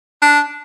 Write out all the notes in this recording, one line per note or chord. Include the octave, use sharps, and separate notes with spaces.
D4